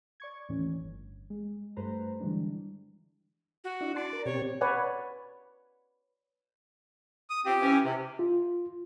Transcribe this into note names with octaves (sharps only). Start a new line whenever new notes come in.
D5 C#6 G#6
D#2 A2 E3 C#4
G1
G#3
G2 A3 B4 C5 A#5
D3 E3 G3 G#3 D4
F#4
D4 E4
D5 A5 C6
A#4
B2 C4 G4 C#5
B4 C#5 D5 F#5 G#5
D#6
F3 C4 G4
E3 C#4
C3
F4